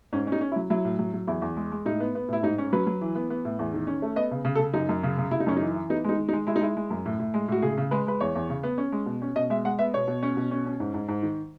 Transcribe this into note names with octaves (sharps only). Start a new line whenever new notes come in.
G#2 C#4
C#4
D#4
C#4
E4
F#3
F#3 E4
A2
F#3
F#3
E2 E4
E2
G#3
G#3
A2 D#4
B3
B3
A2 E4
G#2 D#4
C#4
F#3 B4
F#3
E3
B3
B3
A2
E2
D#3
C#4
A3
B3 D#5
C#3
C#3
A4
C#3
F#2 D#4
F#2
C#3
C#3
C#3 E4
D#4
F#2 C#4
E3 D#4
E3
B3 D#4
G#3 D#4
D#3
D#4
G#3
G#3 E4
D#4
G#3 E4
G#3
F#2
A2
A2
G#3
A2 F#4
C#3 G#4
C#3
G#3 B4
G#3 B4
E2 C#5
E2
C#3
B3
C#4
G#3
B2
C#4
B2 D#5
G#3 E5
G#3 F#5
B3 E5
B2 C#5
B2
C#4
B2
C#4
C#4
G#2
G#2
G#2
D#3